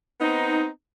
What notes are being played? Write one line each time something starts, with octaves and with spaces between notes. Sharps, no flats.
B3 C4 D#4